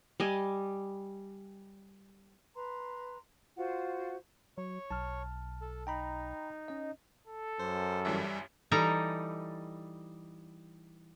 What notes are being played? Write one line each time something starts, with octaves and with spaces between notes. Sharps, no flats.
G3 D#5 G#5
B4 A#5 C6
F4 F#4 C5 F#5
F#3 C#5
B1 A5 F6
A4
D#4 G5 A#5 B5
C#4 D#5
A4
F#2 C5
A1 G2 E3 G3 E5
E3 G3 D#4 A4 A#5